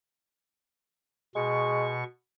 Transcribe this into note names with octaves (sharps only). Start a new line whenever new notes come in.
B2 G#3 C#6